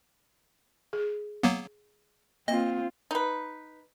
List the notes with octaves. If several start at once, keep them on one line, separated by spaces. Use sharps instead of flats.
G#4
F#3 A#3 B3
A#3 C4 F4 D#5
D#4 B4